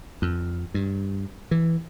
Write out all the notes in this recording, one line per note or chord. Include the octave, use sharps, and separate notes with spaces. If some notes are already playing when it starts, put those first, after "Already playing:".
F2
G2
E3